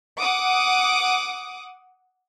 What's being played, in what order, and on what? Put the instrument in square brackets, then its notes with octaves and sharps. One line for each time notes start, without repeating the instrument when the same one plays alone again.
[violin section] F#5 D6 D#6